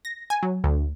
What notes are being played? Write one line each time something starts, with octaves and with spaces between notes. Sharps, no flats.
A#6
G#5
F#3
D2